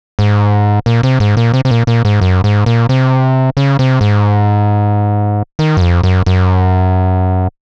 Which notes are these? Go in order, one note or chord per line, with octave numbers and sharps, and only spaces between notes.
G#2
A#2
C3
G#2
A#2
C3
C3
A#2
A#2
G#2
F#2
G#2
A#2
C3
C#3
C3
G#2
D#3
F#2
F2
F#2
F#2